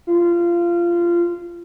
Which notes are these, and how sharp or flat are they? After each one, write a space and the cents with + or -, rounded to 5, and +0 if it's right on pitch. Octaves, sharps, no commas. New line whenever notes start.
F4 -20